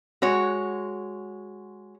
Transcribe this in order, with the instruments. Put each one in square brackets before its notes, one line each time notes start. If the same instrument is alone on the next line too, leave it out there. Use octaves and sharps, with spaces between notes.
[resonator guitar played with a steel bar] G#3 F#4 C#5